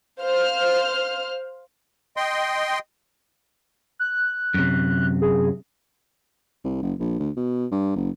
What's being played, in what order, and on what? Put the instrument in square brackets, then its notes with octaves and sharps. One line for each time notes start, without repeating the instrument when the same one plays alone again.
[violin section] C5 F5 F6
[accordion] D#5 G5 C6
[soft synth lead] F#6
[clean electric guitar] F#2 C3
[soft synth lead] G#4
[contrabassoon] C2
F#1
A#1
D2
B2
G2
F#1